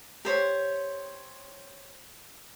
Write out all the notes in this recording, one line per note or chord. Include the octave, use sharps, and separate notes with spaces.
G4 C5 C#5